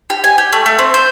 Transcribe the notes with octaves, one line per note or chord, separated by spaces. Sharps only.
G4
G#5
G4
A3
A3
C4
C5